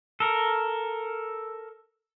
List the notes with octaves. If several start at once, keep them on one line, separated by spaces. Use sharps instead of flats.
A4 A#4